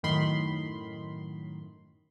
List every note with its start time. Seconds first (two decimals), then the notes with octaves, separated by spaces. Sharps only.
0.03 F#2 A2 D#3 B5 C6